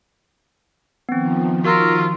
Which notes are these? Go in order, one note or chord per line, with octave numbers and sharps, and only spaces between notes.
D#3 F3 B3 C4
F4 F#4 A#4 E6 C7